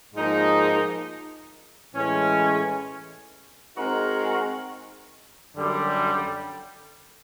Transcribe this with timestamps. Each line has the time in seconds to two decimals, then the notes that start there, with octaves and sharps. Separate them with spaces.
0.15 G#2 F3 A#3 D#4
1.95 A2 E3 G#3 C#4
3.76 G#3 C4 D#4 F#4 A#4
5.57 F#2 D3 G3